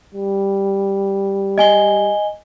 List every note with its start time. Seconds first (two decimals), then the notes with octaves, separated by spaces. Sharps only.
0.14 G3
1.58 D#5 G#5 G7